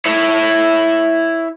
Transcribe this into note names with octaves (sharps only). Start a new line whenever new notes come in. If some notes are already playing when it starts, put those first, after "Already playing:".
E4 C#5